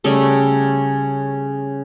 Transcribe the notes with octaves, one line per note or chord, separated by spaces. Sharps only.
C#3 G3 A3